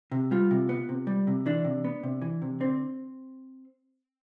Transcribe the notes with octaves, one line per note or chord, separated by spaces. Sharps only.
C3
G3 F4
C3
B3
C3
G3
C3
E3 D4
C3
B3
C3
E3
C3
D3 C4